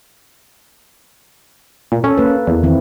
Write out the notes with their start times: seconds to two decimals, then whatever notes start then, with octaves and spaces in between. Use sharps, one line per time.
1.92 A#2
2.04 C#4 A4
2.18 A#3 B4
2.47 E2
2.63 D#3 C4 E4